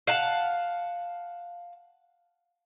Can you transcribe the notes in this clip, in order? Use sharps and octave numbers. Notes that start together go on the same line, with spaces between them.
F5 F#5 A5